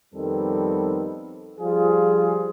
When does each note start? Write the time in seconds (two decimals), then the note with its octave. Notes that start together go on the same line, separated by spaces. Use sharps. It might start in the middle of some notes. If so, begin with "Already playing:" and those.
0.15 F2 D#3 G3 B3 C4 A4
1.60 F3 G3 F4 G#4